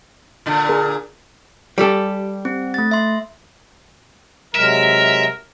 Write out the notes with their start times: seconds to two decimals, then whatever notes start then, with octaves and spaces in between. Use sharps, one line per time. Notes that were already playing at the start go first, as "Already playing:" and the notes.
0.46 A#2 D3
0.69 G#4 A#4
1.78 G3 G4 A4
2.45 C4
2.74 A3 A6
2.91 E5 C6
4.56 C3 F#3 G#3 A#4 E5